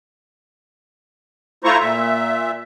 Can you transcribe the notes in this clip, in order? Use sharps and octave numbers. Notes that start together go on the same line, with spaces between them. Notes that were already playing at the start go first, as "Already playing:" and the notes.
A3 E4 F4 C5 A#5 C#6
A#2 E5